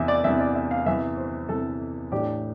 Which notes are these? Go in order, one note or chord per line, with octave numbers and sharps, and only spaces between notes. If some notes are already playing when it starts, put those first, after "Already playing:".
Already playing: E2 C3 E3 E5
D5
E2 C3 E3 E5
D5
E5
F5
E2 C3 E3 E5
C5
E2 C3 E3 A4
A2 E3 A3 D4 G4